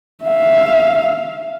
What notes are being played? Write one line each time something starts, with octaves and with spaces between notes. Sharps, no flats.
E5 F5